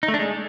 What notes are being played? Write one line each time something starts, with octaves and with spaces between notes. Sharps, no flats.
D#4
A3
D4
G#3